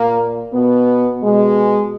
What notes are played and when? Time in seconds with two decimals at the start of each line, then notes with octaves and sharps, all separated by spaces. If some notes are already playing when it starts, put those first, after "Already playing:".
Already playing: A#2 A#3
0.53 B2 B3
1.22 B2 G#3